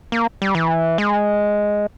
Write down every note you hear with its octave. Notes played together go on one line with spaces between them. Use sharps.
A#3
G3
E3
G#3